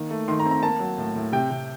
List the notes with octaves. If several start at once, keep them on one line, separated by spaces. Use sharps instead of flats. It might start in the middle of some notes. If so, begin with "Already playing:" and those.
Already playing: D#3 A#3
A3
D#3 C6
A#5
C4
A#5
A#3 A5
F#3
A2
A2
C3 G5
C3